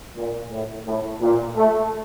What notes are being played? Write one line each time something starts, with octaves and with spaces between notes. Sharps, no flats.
A#2
A2
A2
A#2
A3